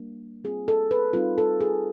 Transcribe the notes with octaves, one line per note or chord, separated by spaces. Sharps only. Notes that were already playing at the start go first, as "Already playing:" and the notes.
Already playing: G3 A#3 D4
G3 C4 F4 G#4
A4
B4
G3 C4 D#4 F4
A4
G#4